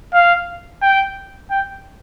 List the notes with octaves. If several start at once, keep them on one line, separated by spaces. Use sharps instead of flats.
F5
G5
G5